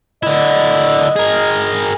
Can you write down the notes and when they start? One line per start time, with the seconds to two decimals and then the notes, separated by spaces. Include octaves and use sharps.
0.23 D3 E4 D#5
1.16 G#4 A#4